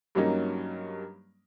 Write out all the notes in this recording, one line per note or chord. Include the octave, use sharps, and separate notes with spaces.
G2 F#3 G3 A#3 C#4 D#4